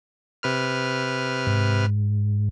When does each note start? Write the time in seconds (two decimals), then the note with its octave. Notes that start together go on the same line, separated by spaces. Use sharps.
0.43 C3 B4 F6
1.47 G#2